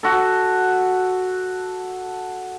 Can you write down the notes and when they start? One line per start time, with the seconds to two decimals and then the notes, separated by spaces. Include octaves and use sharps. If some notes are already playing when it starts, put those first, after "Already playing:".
0.03 F#4 A4